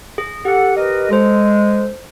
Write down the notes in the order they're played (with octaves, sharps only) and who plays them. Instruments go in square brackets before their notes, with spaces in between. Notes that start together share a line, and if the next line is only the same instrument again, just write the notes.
[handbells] G#4
[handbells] G4 [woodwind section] A4 F#5
[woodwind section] A#4 B4 D#5
[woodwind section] G#3 [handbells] A4 C5